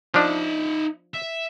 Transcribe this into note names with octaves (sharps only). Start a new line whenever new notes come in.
F3 D4 D#4 E5
E5